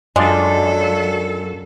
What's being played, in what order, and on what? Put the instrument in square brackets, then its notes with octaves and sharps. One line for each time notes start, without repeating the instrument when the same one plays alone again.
[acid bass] F#2 [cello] F#3 A4 [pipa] G#3 [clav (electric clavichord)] D4 F4 D5